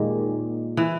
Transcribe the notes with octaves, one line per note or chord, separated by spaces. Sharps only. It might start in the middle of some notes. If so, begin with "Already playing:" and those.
Already playing: D#2 A#2 D#3 G#3 A#3
E3